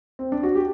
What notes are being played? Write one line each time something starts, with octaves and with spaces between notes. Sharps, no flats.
C4
D4
F#4
G4